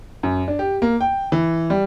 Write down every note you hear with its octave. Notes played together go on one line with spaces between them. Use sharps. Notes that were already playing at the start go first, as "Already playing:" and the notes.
F#2
D4
G4
A#3
G5
E3
G3